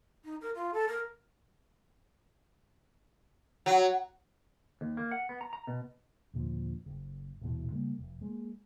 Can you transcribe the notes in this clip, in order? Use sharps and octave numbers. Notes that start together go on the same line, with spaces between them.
D#4
A#4
F4
A4
A#4
F#3
D#2
A#3
F#5
B3
A#5
A#5
B2
D#2 A#2 D3 F3
F#1
D#1 A1 B2 E3
C#3 G3 A#3
F1
G#3 A#3